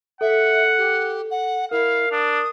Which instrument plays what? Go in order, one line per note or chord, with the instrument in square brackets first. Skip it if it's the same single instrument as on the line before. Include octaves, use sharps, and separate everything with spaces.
[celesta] A4 [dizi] E5 [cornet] F#5
[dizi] G4
F#5
[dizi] E4 [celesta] A#4 [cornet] F5
[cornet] D4 [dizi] D#6